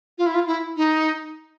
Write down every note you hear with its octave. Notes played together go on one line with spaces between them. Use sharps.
F4
E4
F4
E4
D#4